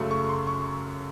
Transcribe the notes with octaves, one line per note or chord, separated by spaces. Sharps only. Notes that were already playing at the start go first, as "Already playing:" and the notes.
Already playing: F#2 C#3 F#3 A3
C#6
C6
C#6